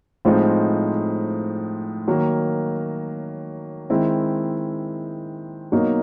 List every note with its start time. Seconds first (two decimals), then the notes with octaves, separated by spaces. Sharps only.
0.25 A2 F3 G#3 C4 D#4
2.07 D#3 F#3 A#3
3.90 D#3 G#3 C4 E4
5.72 B2 F#3 A#3 D#4